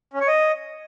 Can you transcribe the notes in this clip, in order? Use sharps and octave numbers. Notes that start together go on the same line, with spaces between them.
C#4
C#5
D#5